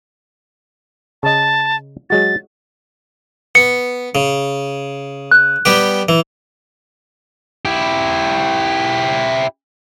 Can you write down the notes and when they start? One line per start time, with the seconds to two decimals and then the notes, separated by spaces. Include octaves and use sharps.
1.23 C#3 D#5 A5
2.10 F#3 G#3 F#4 A6
3.55 B3 C#7
4.15 C#3
5.31 F#6
5.65 G3 B3 G4
6.09 E3
7.65 E4 G4